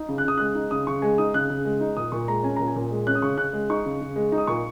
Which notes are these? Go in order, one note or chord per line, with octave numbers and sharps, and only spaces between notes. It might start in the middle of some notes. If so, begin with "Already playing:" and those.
Already playing: D#4
C#3
F#6
C#3 D#6
G#3 F#6
D#4
C#3 D#6
C#3 C#6
G#3 G#5
D#4 D#6
C#3 F#6
C#3
G#3
D#4
A#2 D#6
A#2 C#6
G#3 A#5
C#4 G#5
A#2 A#5
G#5
A#2
G#3
C#4 F#6
D#6
C#3 C#6
C#3 F#6
G#3
D#4 C#6
C#3
C#3
G#3
D#4
D#6
A#2 C#6